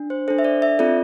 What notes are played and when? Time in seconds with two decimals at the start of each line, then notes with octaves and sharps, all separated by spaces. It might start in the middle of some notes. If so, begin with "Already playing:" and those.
Already playing: D4
0.10 C5
0.28 D4 A4 C5
0.39 E5
0.44 D5
0.62 E5
0.79 C4 F4 A4 D5